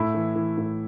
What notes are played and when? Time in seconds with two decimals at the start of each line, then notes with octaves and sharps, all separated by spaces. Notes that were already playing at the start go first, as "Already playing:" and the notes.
Already playing: A2 E4
0.15 E3
0.36 E3
0.57 A2